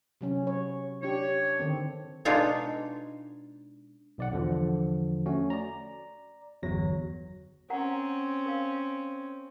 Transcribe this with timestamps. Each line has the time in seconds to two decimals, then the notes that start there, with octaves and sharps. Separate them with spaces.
0.21 C3 F#3 C#4
0.47 C#5
1.03 D4 G4 C#5
1.59 D3 D#3 C4
2.25 B2 G#3 D4 D#4 F4 C#5
4.18 B1 D5 F#5
4.31 E2 D3 F3
5.26 A3 C#4 F#4
5.50 D5 A#5
6.63 G1 E2 F#3 A#6
7.70 C4 C#4 A#4 F#5 A#5
8.46 A#4 F5